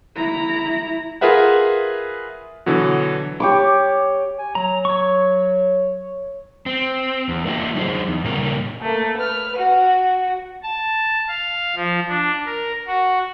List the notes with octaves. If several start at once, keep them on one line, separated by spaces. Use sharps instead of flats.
E4 A#5
F4 G#4 A#4 B4 E5 F#5
B2 D3 E3 F#3
G4 C#5 D6
G#5
F#3 A#5
C#5 C#6
C4
E2
A#3 D4 F4 G4 D#5 E5
F#3 D#4 G#4 C5
E2
A#2 C#3 G3 A#4
A3 A#3
B4 F6
F#4
A5
F5
F3
D4
A#4
F#4